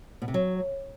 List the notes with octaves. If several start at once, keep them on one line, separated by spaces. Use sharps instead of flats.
B2
C3
F#3